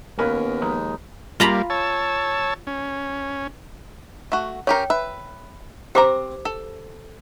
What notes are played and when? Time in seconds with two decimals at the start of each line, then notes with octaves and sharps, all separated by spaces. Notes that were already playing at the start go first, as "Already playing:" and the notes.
0.19 D#2 B3 C#4 A#4 B4 F5
0.61 F3 G#3 D#4
1.40 G3 A#3 F4 A#5 B5
1.70 C#5 A5 E6
2.67 C#4
4.32 A3 F#4
4.67 C#4 G4 A#4 C#5 G5
4.90 B4 E5
5.95 C4 G4 C5 A#5 D6
6.45 A4